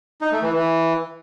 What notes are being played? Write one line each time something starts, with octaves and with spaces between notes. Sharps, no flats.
D#4
A3
E3
E3